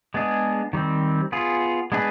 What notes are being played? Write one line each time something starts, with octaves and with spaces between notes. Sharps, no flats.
G#3 B3 D4 G#4
D#3 G3 C4
B3 F4 G#4
G#3 B3 D4 G#4 B4